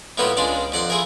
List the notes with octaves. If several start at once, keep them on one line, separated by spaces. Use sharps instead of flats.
A2 G3 A#3 B3 F4 F#4
C#2 G#3 D4 F4 D5
F2 D5 F#5 C6
E4 F4 G#4 A#4